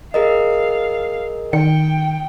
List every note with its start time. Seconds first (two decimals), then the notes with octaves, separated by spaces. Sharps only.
0.14 G#4 A#4 D#5 F5
1.53 D#3 G5 C#7